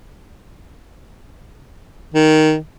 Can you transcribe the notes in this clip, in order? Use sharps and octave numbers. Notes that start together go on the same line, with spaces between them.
D#3